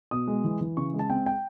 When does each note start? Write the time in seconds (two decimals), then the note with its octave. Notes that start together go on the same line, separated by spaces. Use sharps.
0.11 B2 D#6
0.28 G#3
0.45 E3
0.61 E3
0.77 C#3 C#6
0.94 G#3
0.99 A5
1.10 C4 G5
1.26 G5